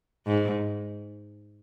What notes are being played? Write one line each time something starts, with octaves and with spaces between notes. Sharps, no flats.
G#2